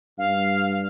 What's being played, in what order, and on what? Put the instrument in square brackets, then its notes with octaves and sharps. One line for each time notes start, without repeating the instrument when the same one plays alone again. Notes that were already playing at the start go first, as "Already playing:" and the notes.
[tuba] G2 [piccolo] F5